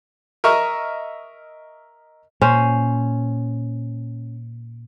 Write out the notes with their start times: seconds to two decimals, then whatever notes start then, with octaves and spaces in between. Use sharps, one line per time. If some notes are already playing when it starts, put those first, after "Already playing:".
0.44 A#4 D#5 E5 C#6 F6
2.42 A#2 C#4 C5